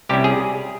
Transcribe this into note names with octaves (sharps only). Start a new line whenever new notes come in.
C2 C3 G3 C#4 E4 G4
G#4